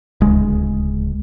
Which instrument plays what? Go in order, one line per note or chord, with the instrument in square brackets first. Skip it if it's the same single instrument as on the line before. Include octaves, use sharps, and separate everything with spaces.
[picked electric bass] D1 C#2 G#3